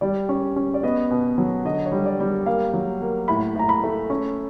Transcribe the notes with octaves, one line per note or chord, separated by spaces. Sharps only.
G3 D5
C#4
C#4
D5
B3 D#5
B2
F#3
D3 D#5
C#5
G3
D5
G3
A#3 F5
F#3
A#3
A2 B5
A2 A#5
B5
A3
C#4